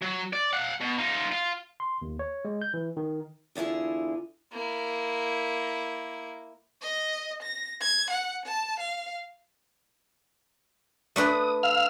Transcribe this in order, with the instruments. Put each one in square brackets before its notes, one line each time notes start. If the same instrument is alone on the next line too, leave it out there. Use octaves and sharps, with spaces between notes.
[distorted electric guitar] F#3
D5
F5 F#5
B2
D#4 F4
F4
[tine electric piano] C6
D#2
C#5
G#3
G6
E3
D#3
[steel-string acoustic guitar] E2 D3 E4 F4 G#4
[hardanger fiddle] A#3 E4
[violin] D#5
A#6
G#6
F#5
A5
F5
[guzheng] A3 D4 B4 [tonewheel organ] D#6
[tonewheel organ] F5 E6 F6